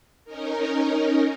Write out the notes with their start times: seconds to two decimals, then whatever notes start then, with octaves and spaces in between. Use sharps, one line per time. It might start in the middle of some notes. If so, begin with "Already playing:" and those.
0.25 C#4 D#4 A#4